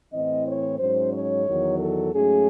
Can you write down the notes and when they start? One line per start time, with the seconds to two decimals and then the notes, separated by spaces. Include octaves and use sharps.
0.12 A2 E3 C4 D#5
0.46 C#5
0.79 G#2 F#3 C#4 C5
1.12 C#5
1.47 E2 D#3 F#3
1.79 A4
2.12 G#2 F#3 A3 C#4 G#4